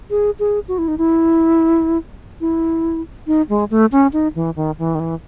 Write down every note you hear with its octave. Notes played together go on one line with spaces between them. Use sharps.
G#4
G#4
F#4
E4
D#4
E4
E4
D#4
G#3
A3
C#4
D#4
E3
D#3
E3
D#3
E3